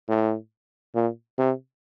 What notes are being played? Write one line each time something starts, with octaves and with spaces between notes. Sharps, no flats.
A2
A#2
C3